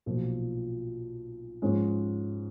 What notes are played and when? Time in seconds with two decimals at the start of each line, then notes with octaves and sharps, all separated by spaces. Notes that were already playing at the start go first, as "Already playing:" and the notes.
0.06 B1 A#2 F3
1.62 G#2 F3 G#3 C#4